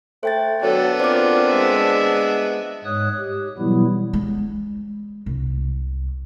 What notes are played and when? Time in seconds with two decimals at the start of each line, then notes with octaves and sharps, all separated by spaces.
0.23 A3 C5 G5 A6
0.62 F#3 B3 D4 A4
1.00 C4 F4 A#4 D5 D6
1.48 G#3 E5
2.85 G#2 G#3 C#5 D#6 F#6
3.19 G4
3.58 B2 E3 F#3 G3 B3 E4
4.13 G#3
5.26 C2